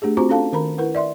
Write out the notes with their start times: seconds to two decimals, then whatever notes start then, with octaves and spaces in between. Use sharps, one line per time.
0.02 A3 D4 G4 G#4
0.17 C4 F4 F#4 C5 A#5 C#6
0.29 C#4 D4 A4 F5 A5
0.53 D#3 A#4 A#5 B5
0.78 E4 A#4 B4 F#5
0.95 D5 E5 C6